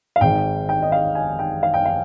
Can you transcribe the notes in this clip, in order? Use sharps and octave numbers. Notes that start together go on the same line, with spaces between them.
F5
G#1 G#2 D#3 G5
G5
D#5
F5
G#5
G5
F5
G5
F5